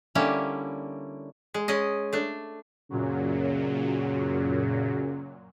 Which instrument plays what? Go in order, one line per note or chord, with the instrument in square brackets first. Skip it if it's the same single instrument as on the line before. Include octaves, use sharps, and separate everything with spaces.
[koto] D3 G3 A#3 C#4 E4
G#3
G#3 C#4 D#5
A3 D4
[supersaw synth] F#2 A#2 F#3 [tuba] C#3